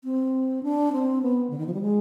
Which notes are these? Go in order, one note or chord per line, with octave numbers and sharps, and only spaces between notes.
C4
D4
C4
B3
D3
D#3
F3
G3
G#3